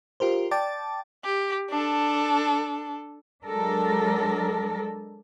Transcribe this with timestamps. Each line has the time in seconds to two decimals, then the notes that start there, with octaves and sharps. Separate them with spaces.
0.20 F4 G4 A#4 C5
0.51 D5 G5 A5 D6 A6
1.24 G4
1.70 D4 A4
3.43 F#3 G#3 D4 A4 A#4